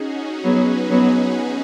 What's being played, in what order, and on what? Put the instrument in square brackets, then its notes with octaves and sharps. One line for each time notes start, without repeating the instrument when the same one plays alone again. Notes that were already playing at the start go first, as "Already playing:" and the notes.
Already playing: [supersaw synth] C#4 D#4 F#4 G#4
D#4 G#4
[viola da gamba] F#3 B3 [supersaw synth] F#4 B4
[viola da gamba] F#3 B3 [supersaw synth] D#4 G#4